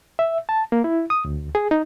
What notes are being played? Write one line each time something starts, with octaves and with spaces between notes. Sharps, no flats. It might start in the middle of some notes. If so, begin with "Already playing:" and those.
E5
A5
A#3
E4
D#6
D2
G#4
D#4